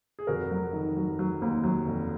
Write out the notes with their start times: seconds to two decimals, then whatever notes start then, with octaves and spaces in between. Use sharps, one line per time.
0.19 G#4
0.27 F1 F#4 A#4
0.51 F#3
0.73 D#3
0.97 F#3
1.19 F#3
1.42 D#2
1.64 F#3
1.87 F1